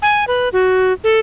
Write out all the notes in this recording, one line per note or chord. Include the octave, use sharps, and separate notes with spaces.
G#5
B4
F#4
A4